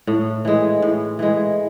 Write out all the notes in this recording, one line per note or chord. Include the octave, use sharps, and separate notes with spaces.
A2
E3 G#3
A2
E3 G#3